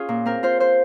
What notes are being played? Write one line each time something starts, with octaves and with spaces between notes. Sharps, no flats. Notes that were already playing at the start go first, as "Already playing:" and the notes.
Already playing: C#4 F4 G#4
A#2
C4 A#4
F4 C5
C5